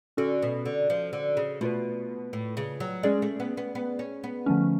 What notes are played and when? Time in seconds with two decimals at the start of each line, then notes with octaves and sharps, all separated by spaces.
0.17 D3 C#4 F#4 A4
0.42 B2
0.65 D3
0.90 F3
1.13 D3
1.37 C#3
1.61 B2 A3 F4 B4
2.33 A2
2.57 C#3
2.80 F#3
3.03 G#3 C#4 G#4 D5
3.22 A3
3.40 B3
3.57 B3
3.75 B3
3.99 C#4
4.24 B3
4.46 D3 F3 A3 C#4